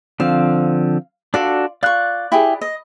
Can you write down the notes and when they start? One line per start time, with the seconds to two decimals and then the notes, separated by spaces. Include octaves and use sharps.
0.20 D3 F3 C4 F5
1.34 D4 F4 F#4 A4 D5
1.83 F4 D5 C#6 F#6
2.32 E4 G4 G#4
2.61 D#5